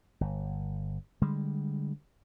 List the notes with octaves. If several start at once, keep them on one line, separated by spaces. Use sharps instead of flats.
G1
D3 G3 G#3